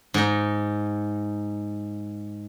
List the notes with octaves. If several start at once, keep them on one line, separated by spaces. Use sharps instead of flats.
G#2 D#4